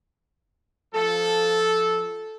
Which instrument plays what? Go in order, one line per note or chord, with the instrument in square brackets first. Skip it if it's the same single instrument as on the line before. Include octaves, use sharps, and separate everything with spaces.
[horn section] F3 A4